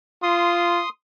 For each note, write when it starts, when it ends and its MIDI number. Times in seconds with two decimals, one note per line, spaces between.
0.23 0.82 65
0.23 0.89 84
0.23 0.89 87